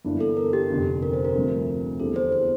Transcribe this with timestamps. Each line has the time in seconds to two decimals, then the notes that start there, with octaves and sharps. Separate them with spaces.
0.04 G1 G2 E3 A#3 D4
0.20 A4
0.37 A#4
0.53 G4
0.70 F1 F2 D3
1.03 A#4
1.13 C5
1.25 A#4
1.34 D2 C3 F3 A3 C4
2.00 E2 D3 G3 C4 G4 A4
2.16 C5
2.32 C5